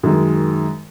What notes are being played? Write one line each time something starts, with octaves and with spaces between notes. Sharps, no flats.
F#2 D#3 G#3